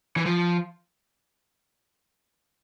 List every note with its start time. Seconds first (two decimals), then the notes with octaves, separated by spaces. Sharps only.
0.17 E3
0.26 F3